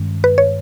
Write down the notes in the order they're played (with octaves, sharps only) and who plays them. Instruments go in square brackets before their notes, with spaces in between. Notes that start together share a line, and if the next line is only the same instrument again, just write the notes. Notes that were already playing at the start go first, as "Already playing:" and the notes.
Already playing: [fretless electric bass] G2 D#3 G#3 C#4
[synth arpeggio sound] B4
C#5